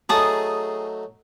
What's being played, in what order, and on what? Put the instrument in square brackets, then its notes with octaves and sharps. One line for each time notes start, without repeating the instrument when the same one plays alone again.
[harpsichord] F#3 A3 D#4 [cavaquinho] G#4 A5 D#6